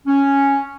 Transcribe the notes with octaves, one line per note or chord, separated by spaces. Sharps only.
C#4